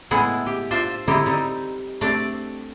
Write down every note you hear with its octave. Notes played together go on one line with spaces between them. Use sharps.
A2 G#3 B3 E4 G#4
G4
D4 F4 C5 E5
D3 C4 D#4 E4 G4
G3 D#4
A3 C4 D4 G4 D5